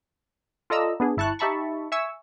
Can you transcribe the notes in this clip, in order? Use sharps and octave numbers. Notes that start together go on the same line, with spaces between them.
F4 A4 D5 D#5 A#5 E6
B3 D4 G#4
G1 E4 A5 C#6 F#6
D#4 G4 E5 A5 B5 C#6
E5 G#5 C#6 E6